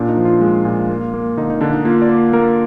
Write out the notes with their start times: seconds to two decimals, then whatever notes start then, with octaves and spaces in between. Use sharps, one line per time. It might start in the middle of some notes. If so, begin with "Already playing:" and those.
Already playing: A#2 D4
0.09 D#4
0.17 F3
0.25 F4
0.41 G#3
0.65 A#2
0.89 A#3
1.14 A#3
1.37 D3 D#4
1.50 D#4
1.61 D3 D4
1.74 D#4
1.85 A#3 F4
2.02 D5
2.09 A#3
2.33 A#3 A#4